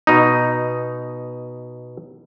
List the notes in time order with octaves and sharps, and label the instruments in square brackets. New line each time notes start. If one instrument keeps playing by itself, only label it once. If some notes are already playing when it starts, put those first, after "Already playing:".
[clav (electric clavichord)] B2 D#4